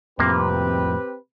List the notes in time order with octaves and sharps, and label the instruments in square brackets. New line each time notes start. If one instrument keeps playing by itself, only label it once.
[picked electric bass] F2 A2 F3 [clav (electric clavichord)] C3 A#3 [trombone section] C4 G4 B4